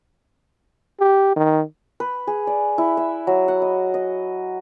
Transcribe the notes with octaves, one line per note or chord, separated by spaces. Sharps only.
G4
D#3
B4
G#4
D5
E4
E5
F#3
F#5
D#5
D#5